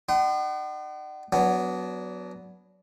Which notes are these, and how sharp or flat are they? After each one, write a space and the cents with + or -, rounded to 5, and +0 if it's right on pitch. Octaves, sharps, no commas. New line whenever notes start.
D#4 -45 F#5 +45 C6 -40
F#3 +0 B3 +0 D4 -30